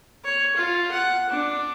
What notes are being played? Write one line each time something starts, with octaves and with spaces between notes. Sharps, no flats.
C#5
F4
F#5
D4